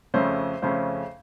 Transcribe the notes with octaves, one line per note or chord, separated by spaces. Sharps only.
F2 C#3 A3 C#4 C5
F2 C#3 A3 C#4 C5